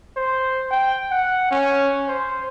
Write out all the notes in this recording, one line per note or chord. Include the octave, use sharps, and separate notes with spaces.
C5
G5
F#5
C#4
C5